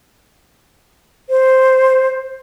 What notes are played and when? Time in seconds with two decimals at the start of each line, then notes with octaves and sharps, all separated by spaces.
1.29 C5